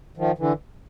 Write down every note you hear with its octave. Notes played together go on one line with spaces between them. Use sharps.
D#3 F3
D3 E3